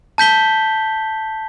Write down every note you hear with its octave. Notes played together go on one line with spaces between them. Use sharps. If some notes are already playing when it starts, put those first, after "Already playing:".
A5 G6 B6 G7